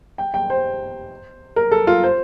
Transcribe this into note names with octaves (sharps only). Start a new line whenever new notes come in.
G5
G5
C5
A#4
A4
F4
C5